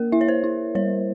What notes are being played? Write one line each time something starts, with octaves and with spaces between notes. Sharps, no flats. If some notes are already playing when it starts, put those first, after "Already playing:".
Already playing: A#3 A#4
E4 E5
C#5
C5
E4
G3 C#5